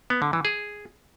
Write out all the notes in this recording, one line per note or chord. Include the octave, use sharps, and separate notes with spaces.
B3
D3
E3
G#4